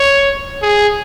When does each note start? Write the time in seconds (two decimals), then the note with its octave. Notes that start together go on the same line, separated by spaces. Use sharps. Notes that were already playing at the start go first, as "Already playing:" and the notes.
Already playing: C#5
0.62 G#4